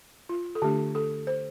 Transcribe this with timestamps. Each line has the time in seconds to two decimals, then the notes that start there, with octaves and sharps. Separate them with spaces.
0.29 F4
0.55 A4
0.62 D3 A3 D4 G4
0.95 A4
1.27 C5